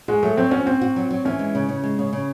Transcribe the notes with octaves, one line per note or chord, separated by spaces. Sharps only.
G#3 F#4
F#3 A3
F#3 C4
C#4 F#4
C4 F#4
F#4
F#3
F#3
E3 C#4
G#3
C#3
C#3
G#3
C#3
C#3